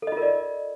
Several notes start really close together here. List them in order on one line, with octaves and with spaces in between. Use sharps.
A4 D#5 F4 A#4 D5